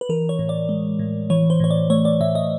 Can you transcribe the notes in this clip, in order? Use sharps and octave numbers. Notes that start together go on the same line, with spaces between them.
B4
E3 A#4
C#5
A2
D5
G#3
A2
E3 C#5
C5
A2 C#5
D5
A3 C#5
D5
A2 E5
D#5